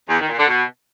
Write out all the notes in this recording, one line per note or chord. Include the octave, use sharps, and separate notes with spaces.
E2
D#3
A#2
D3
B2